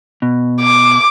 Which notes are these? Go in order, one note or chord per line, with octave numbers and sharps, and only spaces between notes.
B2
D6